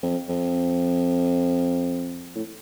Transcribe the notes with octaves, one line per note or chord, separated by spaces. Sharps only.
F2
F2
A2